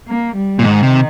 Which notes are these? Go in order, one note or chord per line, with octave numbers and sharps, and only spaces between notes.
A#3
G3
A#2
G#2 D#3
C3